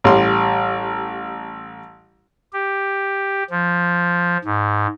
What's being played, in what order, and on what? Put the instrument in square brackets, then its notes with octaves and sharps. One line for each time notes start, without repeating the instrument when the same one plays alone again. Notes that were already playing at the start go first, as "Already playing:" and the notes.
[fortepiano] A1 G3 C6
[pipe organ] G4
F3
G#2